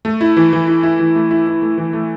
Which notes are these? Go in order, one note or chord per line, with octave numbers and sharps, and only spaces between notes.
A3
E4
E3
E3
E4
E4
E3
A3
E4
E4
A3
E3
A3